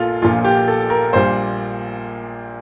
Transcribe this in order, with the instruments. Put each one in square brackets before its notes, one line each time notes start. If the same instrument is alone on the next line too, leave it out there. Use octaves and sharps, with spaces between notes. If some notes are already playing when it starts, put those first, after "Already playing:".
Already playing: [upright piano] A#1 A#2 F4 A4
A#1 A#2 F3 F4
G4
A4
A#4
A#1 A#2 G3 C5